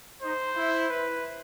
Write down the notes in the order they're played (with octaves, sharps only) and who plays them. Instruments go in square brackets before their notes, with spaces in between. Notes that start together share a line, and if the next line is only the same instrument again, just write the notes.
[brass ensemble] D#4 [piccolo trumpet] C5
[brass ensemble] E4
[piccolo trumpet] B4